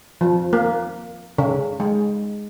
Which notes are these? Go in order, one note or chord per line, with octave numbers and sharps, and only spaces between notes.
F3
A#3
C#3
G#3